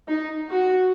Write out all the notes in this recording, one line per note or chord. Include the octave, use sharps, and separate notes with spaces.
D#4
F#4